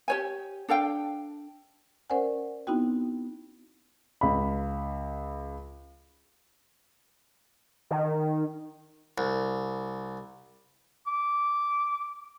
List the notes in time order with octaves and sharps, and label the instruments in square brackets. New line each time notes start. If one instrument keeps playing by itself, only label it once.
[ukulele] G4 C#5 G#5
D4 A4 F5 G5
[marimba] C#4 A#4 C5 D5 F#5 G#5
B3 C4 D#4 E4 F#4 G5
[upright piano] C#2 B5
[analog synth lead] D#3
[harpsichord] C2
[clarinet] D6